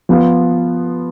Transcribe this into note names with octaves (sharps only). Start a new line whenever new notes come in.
F3 B3 F4